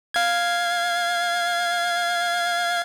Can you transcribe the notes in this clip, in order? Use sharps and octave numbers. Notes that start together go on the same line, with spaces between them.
F5 G#6